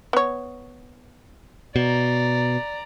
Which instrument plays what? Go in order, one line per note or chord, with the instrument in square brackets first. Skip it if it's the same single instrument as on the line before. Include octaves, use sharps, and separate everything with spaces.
[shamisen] B3 C#5
[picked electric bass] B2 [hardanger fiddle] D5 A#5